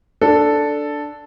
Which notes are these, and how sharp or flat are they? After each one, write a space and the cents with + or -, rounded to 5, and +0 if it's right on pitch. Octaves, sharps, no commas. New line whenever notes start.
D4 +0 A4 +0